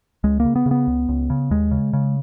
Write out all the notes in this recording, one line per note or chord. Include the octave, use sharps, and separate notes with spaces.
C#2 G#3
C#3 A#3
B3
C#3
B3
C#2
C#2
C#3
D#2 G#3
C#3
C#3